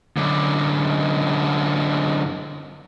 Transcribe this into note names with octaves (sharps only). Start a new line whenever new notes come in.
F#2 D3